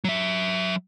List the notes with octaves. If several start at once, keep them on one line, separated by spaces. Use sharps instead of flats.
F#3 E5